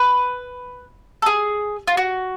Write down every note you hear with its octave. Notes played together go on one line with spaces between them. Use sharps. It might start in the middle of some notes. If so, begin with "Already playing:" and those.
Already playing: B4
A4
G#4
F4
F#4